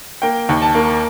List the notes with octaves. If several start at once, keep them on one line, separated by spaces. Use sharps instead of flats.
A#3 G5
D#2
A5
A#3